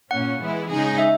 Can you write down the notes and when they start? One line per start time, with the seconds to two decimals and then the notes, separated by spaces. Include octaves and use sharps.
0.10 A#2 A#3 C#4 F#5
0.41 E3 G#3 B3 E4
0.69 C#3 G#3 D#4 G#4
0.98 E5